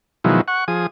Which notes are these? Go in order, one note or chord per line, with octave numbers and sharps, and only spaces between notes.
B2 D#3 F3 F#3 G#3 E4
F#5 C#6
F3 G#4 D#6